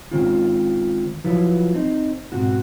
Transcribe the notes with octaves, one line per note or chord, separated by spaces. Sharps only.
D#3 G#3 C4 C#4 F4
F3 F#3 E4 B4
C4 D#4
G#2 B2 C4 F#4